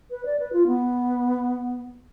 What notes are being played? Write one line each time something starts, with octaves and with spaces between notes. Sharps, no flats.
B4
D5
B4
F4
B3